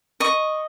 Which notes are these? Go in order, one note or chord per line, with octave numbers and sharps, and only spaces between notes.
D#5 C#6